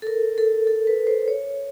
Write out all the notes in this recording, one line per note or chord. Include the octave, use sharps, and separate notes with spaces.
A4
A#4
A4
A4
B4
C5
C#5